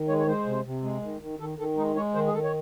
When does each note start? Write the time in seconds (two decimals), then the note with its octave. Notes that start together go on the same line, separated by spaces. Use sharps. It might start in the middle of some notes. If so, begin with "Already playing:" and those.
Already playing: D#3
0.08 G#3 C#5
0.19 C#5
0.27 G#3 C5
0.46 C3
0.64 C3
0.83 G#3
1.02 D#3
1.21 D#3
1.40 D#3 A4
1.58 D#3 A4
1.77 G#3 D#4
1.96 G#3 C#5
2.15 D#3 C5
2.27 G#4
2.33 D#3 A4
2.44 C#5